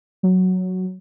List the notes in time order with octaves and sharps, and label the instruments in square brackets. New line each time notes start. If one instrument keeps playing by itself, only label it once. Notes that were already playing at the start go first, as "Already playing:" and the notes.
[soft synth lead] F#3